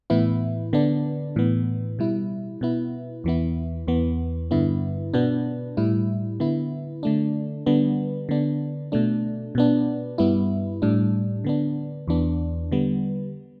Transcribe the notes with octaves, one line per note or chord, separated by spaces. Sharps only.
A2 E3 B3 E4
D3 B3 D4
A2 E3 B3
B2 G3 E4
B2 B3 E4
E2 E3 B3 E4
E2 E3 B3
G2 D3 B3 E4
B2 B3 D4
A2 G3 E4
D3 B3 E4
D3 A3 D4
D3 G3 B3 D4
D3 B3 D4
B2 A3 D4
B2 B3 D4
G2 G3 B3 E4
A2 G3 D4
D3 B3 D4
E2 E3 B3 D4
D3 G3 B3